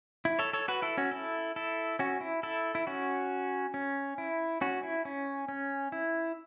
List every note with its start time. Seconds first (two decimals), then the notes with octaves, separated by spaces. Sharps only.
0.25 E4
0.39 A4 C#5
0.53 A4 C#5
0.68 F#4 B4
0.82 E4 A4
0.97 C#4 F#4
1.11 E4 A4
1.56 E4 A4
1.99 C#4 F#4
2.21 E4
2.43 E4 A4
2.75 E4
2.87 C#4 F#4
3.74 C#4
4.18 E4
4.61 C#4 F#4
4.83 E4
5.05 C#4
5.48 C#4
5.92 E4